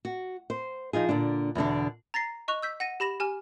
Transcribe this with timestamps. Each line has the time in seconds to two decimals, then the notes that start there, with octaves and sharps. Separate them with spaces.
0.05 F#4
0.50 C5
0.93 F3 D#4 F4 G#4
1.09 A#2 D3 D4
1.55 E2 B2 D3 D4
2.14 A#5 A6 A#6 C7
2.48 D#5 C#6 F#6 F7
2.62 E6 G6 B6
2.80 F#5 A#6 D#7
3.00 G4 B5 A#6 E7
3.20 G4 G#5 F6